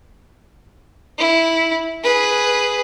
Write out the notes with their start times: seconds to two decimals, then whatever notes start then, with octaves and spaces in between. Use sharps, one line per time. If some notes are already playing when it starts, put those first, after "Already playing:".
1.18 E4
2.04 G#4 B4